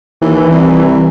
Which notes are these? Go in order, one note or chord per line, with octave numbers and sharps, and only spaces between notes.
D#2 E3
C2